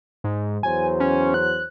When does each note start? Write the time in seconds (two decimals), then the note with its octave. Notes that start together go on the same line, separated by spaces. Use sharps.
0.24 G#2
0.63 E2 F#3 C5 G#5
1.00 C#4
1.34 F#6